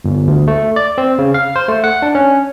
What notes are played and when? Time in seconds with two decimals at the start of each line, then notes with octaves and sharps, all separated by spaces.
0.05 G1
0.27 D2
0.48 A3
0.76 D5
0.98 C4
1.18 C#3
1.34 F5
1.56 C5
1.68 A3
1.84 F#5
2.02 D4
2.15 C#4